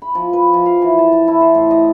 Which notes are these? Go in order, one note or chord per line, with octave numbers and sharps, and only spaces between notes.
B5
F3
B4
F3
F5
E3
A5
A5
E4
C5
A2
D#5